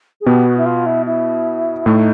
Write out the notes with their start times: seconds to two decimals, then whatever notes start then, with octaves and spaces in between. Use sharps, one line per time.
0.21 G#4
0.26 B2 B3 G4
0.47 F#4
0.57 E4
0.66 F4
0.86 E4
1.06 E4
1.86 A2 A3 D#4